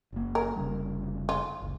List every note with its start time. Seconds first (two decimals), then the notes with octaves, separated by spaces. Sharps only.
0.13 F#1 A#3
0.35 A#4
0.56 F1 C#3 G3
1.29 F4
1.60 F#1 C#2